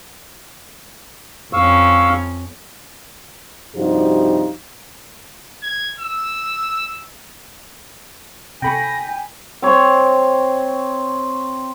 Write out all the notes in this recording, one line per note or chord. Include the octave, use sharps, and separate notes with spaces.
F2 C#4 F5 C#6 E6
G2 C3 F3 D#4 F#4 G4
G#6
E6
C3 A4 G5 G#5 B5 C#6 A#6
C4 C#5